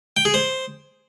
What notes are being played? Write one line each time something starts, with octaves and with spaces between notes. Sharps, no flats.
G5
G#4
C5